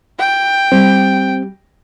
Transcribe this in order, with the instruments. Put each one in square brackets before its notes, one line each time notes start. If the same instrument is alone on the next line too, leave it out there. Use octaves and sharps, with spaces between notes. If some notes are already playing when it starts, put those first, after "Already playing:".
[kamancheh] G5
[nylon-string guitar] G3 [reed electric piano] C4